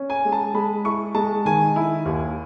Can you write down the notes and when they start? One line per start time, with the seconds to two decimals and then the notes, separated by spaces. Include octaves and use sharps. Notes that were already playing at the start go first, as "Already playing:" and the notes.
Already playing: C#4
0.10 G#5
0.25 G#3
0.32 A5
0.54 G#3 B5
0.85 E4 C#6
1.15 G#3 A5
1.45 D#3 G#5
1.76 E4
2.05 D#2